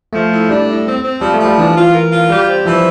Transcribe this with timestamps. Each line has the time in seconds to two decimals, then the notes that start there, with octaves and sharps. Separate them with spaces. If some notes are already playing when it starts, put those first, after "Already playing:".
0.13 F3 A3
0.31 A2
0.49 G3 D4
0.68 A2
0.85 C4
1.03 C4
1.21 F3 G3
1.34 A3
1.40 F3
1.46 G3
1.57 E3 D4
1.76 F4
1.94 A#4
2.11 F4
2.30 G3 G4
2.48 C4
2.66 E3 F3